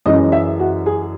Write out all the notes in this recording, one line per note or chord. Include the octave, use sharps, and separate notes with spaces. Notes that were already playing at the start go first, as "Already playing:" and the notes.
F#2 E3 G#3 C#4 D#5
E5
F#4
G#4